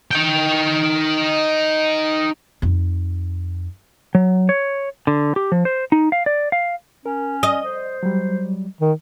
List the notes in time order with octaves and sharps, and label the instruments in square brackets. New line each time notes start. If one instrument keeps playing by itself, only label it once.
[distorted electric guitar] D#4 G5
[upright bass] F2 D#4
[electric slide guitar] F#3
C#5
D3
G4
F3
C5
D#4
F5
D5
F5
[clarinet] C#4 [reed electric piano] A#4
[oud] D#5 [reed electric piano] D#6
[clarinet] C5
[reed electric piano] F#3 G3
[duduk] D#3